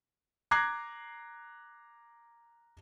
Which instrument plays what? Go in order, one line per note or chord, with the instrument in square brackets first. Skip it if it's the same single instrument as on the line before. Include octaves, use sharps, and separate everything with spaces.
[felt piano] A#5 D6 F#6 G#6 A#6 C7